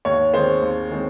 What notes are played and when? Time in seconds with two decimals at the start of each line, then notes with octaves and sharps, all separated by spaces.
0.05 D#2 C#5
0.33 D#3 G#3 C4 C5
0.62 D#2
0.90 D#3 G#3 C4